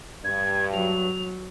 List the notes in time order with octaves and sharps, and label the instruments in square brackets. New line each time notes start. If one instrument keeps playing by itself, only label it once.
[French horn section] G2 [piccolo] G#6
[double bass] F#3 [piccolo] F7